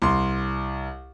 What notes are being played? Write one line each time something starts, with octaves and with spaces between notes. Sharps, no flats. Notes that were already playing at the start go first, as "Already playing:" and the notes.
C2 C6